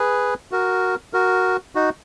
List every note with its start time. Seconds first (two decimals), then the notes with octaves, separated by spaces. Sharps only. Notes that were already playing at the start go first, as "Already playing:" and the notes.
Already playing: G#4 B4
0.52 F#4 A#4
1.13 F#4 A#4
1.75 D#4 F#4